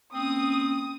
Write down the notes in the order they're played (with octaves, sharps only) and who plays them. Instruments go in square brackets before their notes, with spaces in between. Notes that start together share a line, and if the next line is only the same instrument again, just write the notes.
[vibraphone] A#3 C#4 [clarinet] C4 [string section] D#6